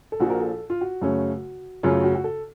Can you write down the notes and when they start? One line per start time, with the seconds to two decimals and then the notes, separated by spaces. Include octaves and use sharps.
0.12 A4
0.20 A#1 A#2 F3 F#4
0.30 A#4
0.41 A4
0.70 F4
0.81 F#4
1.01 F#2 C#3 F#3 A3 C#4
1.83 F#2 C#3 F#3 A3 C#4 F4
2.04 F#4
2.15 F#4
2.24 A4